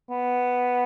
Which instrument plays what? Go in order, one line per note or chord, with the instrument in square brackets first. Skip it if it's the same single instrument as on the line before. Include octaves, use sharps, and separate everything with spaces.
[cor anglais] B3